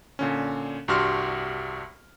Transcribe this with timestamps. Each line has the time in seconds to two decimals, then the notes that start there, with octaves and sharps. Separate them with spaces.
0.19 A#2 D3 C#4
0.88 C2 G2 F#4 G4 C6 F6